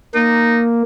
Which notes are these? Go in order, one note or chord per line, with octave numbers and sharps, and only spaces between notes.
A#3 D#4